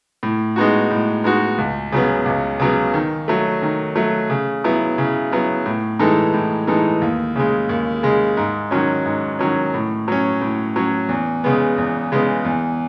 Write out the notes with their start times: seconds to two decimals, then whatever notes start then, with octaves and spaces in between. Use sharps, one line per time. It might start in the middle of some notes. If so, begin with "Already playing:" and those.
0.23 A2
0.56 G#3 B3 D#4 F#4
0.91 A2
1.24 G#3 B3 D#4 F#4
1.58 C#2
1.92 C#3 F#3 B3
2.26 C#2
2.60 C#3 F#3 B3
2.94 D#3
3.28 F#3 A3
3.62 D#3
3.96 F#3 A3
4.30 C#3
4.64 F#3 B3 E4
4.98 C#3
5.32 F#3 B3 E4
5.66 A2
5.99 E3 G#3 D#4 A4
6.34 A2
6.67 E3 G#3 D#4 A4
7.02 D#2
7.36 C#3 G#3
7.69 D#2
8.03 C#3 G#3
8.37 G#2
8.71 D#3 F#3 C#4
9.05 G#2
9.39 D#3 F#3 C#4
9.74 A2
10.08 F#3 C#4
10.41 A2
10.76 F#3 C#4
11.09 E2
11.44 C#3 G#3 B3
11.78 E2
12.12 C#3 G#3 B3
12.45 E2